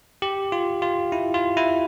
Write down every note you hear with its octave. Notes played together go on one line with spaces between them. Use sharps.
G4
F4
F4
E4
F4
E4